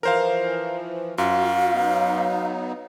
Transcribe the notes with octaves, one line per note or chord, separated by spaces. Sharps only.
E3 F3 A#4 C5 F5
F#2 F4 F#4 F5
F#3 B3 D#4